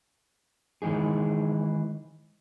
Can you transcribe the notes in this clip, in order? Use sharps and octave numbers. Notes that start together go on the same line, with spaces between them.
D#3 E3 G#3 D#4 G#4